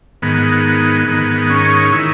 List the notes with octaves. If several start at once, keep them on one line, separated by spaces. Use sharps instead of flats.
G#2 D#3 B3
G#2 D#3 B3
C#4
D#3 E4